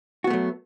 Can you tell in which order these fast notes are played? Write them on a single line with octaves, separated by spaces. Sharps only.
F#4 B3 A3 F#3